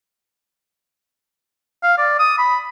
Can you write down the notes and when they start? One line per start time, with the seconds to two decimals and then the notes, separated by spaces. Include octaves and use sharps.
1.84 F5
1.98 D5
2.19 D#6
2.38 B5